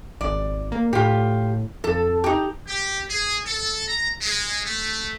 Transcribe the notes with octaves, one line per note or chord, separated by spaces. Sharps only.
G#1 D5
A#3
A2 F4 G4
F2 A4
D#4 G4
G4
G#4
A4
A#5
G#3
A3